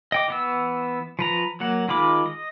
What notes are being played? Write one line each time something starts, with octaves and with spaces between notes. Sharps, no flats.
D#5 G5 D6
E3 B3 E6
F3 B4 A#5
F#3 A#3 F#5
D#3 G#3 F4 B5 D6
D#5